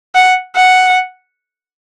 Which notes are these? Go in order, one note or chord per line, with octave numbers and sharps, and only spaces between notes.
F#5
F#5